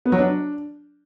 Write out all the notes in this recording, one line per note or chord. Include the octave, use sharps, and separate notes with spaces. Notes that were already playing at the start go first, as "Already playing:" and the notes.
B3
F#3
D4